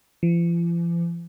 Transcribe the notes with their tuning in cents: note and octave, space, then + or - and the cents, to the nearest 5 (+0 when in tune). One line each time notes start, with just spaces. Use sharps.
F3 -45